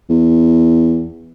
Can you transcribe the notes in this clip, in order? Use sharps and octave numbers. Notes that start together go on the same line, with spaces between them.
E2